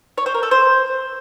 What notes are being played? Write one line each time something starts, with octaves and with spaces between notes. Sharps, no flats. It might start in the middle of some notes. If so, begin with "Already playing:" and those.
C#5
C5
A#4
A4
C5